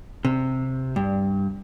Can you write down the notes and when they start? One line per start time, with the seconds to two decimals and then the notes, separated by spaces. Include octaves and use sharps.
0.25 C3
0.96 G2